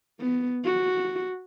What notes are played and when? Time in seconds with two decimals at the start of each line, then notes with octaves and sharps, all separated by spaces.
0.20 B3
0.65 F#4